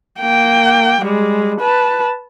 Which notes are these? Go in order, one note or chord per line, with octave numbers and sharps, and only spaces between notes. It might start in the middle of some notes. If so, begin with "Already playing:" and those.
A#3 G5
G3 G#3
B4 A5